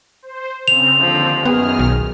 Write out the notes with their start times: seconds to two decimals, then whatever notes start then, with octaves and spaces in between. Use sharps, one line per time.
0.22 C5
0.68 C#3 C4 F7
1.00 D#2 D3 F3 C4
1.45 F#2 D#3 B3 G#4 F6
1.79 B1